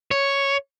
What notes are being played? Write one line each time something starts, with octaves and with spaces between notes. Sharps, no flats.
C#5